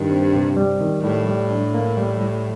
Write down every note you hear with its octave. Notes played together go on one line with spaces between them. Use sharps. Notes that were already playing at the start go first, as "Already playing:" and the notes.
Already playing: G2 D#3
C4
C3
G3
D#3
A2 G3
G3
D4
A#3
G3
G3